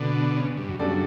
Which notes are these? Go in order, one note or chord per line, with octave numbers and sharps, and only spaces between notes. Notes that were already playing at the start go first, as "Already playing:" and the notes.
Already playing: B2 D3 A3 D4
C#3
G2
F#2
F#2 C#3 G3 D4 A4 D5